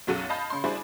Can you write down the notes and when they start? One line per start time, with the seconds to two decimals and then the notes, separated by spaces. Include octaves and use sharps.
0.07 B1 F#2 F#3 F#4 A4 D#7
0.29 D#5 F5 A5 B5 G6
0.50 C#3 C6
0.64 G3 D4 E4 F#4 G#4 C5